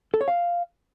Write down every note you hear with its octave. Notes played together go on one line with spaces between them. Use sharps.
A4
C#5
F5